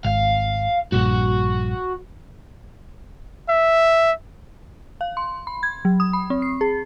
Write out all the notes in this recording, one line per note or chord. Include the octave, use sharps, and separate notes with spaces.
G#1 F5
A#1 G2 F#4
E5
F5
C6
B5
G#6
F#3
D#6
B5
C4
C7
G#4